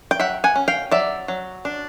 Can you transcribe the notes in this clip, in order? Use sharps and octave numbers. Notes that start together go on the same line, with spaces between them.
G5
F#3 E5 F#5
F#5 G#5
C#4
F5 G5
F#3 D5 E5
F#3
D4